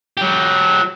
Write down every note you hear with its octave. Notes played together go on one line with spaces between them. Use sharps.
F#3 G4